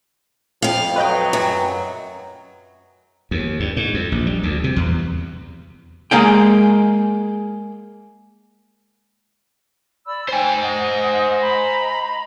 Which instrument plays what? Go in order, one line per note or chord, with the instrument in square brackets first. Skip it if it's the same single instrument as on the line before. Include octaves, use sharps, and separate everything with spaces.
[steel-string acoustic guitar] F2 F5 [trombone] F3
[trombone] F#3 [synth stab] B4 D#5 G5
[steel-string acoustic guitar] F#2
[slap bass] D#2
G2
G#2
F2
A#1
G3
D2
C3
E2
[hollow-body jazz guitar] G#3 A#3 G#4 G5
[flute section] D5 B5 E6
[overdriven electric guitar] C5 G#5 [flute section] G5
[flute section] D#5 F#5 D#6
D#5 A#5 B5